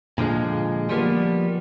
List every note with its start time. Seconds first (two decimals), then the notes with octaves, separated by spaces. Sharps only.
0.18 A#2 D3 F3 G#3
0.89 F3 G3 A#3 B3